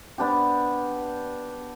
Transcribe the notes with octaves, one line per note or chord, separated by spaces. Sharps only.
B3 D4 G4